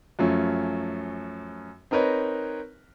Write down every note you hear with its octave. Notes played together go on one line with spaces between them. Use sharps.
F#2 F3 A3 C#4
C4 D#4 A#4 B4 C#5